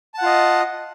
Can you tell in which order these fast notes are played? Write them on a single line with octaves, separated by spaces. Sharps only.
A5 F#5 F4 D#5